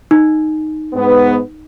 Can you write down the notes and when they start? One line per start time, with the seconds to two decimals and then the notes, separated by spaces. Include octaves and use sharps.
0.11 D#4
0.94 G#2 B3